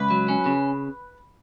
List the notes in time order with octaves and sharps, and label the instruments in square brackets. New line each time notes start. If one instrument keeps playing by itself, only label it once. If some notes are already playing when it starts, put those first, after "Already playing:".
Already playing: [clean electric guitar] C#2 [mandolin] B4
[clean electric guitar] F#3
C#4
C#3